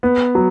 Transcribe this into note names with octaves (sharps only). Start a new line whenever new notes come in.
B3
F#3